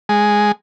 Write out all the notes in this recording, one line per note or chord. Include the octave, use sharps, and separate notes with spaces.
G#3